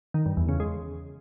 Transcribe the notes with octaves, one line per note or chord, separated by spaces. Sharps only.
D#3
G2
E2
C#3
G#3